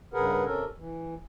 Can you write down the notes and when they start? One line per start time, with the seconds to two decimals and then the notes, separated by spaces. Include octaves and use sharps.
0.14 G2 C#3 G#4 A#4 B4 F#5
0.45 C3 C#4 A4 A#4
0.77 E3